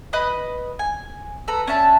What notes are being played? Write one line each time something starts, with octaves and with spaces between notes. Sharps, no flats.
B4 D#5 B5 D#6
G#5
A4 B4 A#5
C#4 D4 E5 A5